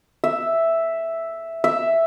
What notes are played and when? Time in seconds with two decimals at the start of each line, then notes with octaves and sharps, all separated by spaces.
0.24 E5
1.64 E5